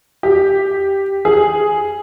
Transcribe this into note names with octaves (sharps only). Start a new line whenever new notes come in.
G4
G#4